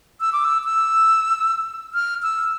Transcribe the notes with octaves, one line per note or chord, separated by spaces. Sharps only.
E6
D6
E6
E6
F6
E6